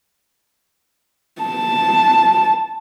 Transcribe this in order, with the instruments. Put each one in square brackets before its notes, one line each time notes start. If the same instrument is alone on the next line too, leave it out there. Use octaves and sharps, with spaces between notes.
[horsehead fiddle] A5